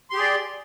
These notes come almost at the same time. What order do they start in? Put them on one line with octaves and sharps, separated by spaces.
C6 G4 G#4 D5